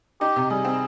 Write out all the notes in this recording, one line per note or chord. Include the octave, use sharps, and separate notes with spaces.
D#4 G4
C3
G3 G#4
C4